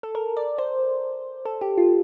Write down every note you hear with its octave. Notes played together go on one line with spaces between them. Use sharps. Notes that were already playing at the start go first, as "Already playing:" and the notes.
A4
A#4
D5
C5
A4
G4
F4